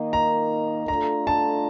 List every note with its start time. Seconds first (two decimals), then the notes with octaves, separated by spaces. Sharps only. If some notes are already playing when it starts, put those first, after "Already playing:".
Already playing: D#3 A#3 D#4 A#4 D#5
0.13 A#5
0.88 A3 D4 F4 A4 A#5
1.27 A5